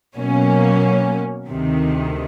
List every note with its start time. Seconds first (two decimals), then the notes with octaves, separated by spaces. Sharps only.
0.16 B2 F#3 A#3 C#4
1.46 D2 C3 D#3